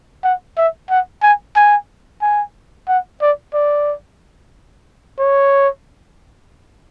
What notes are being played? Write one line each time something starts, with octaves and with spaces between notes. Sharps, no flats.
F#5
E5
F#5
G#5
G#5
G#5
F#5
D5
D5
C#5